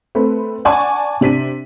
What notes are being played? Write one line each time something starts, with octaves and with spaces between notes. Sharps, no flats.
A3 C4 B4
D5 F#5 G#5 A5 C#6
C3 D4 B6 D#7